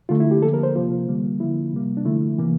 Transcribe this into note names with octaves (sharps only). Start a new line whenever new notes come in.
D3 A3 F4
E4
G4
D3 F3 A#3 A4
A#4
C5
C3 F3 A#3 F4
D3 G3 A#3
D3 F3 A#3 E4
C3 G3 A#3
D4
D3 F3 A3 E4
C3 E3 A#3